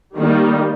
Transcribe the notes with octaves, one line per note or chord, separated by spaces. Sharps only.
D#3 G3 A#3